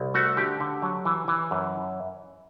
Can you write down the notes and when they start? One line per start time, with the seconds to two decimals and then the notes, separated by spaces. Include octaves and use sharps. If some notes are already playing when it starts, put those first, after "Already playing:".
Already playing: C2
0.14 A3 F#4
0.37 D3 G4
0.60 D3
0.82 F#3
1.05 E3
1.28 E3
1.51 F#2